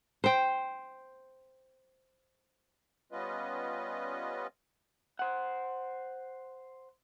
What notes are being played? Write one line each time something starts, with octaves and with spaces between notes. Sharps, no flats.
C5 G5
G3 B3 C#4 F4 B4 D#5
C5 F#5